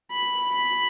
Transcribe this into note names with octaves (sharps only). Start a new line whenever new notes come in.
B5